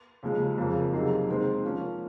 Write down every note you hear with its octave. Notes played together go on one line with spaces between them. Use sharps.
D#2 C#3 F3 G#3
F2 C#3 F3 A#3
C3 F#3 A#3 D#4 G#4
D#3 G#3 C4
F3 A#3 C#4